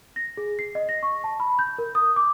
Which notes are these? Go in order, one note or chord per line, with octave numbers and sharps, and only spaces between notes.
A#6
G#4
C7
D#5
A#6
C#6
A5
B5
G6
A#4
D#6
D6